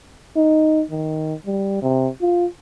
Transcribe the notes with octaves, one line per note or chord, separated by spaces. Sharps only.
D#4
D#3
G3
C3
F4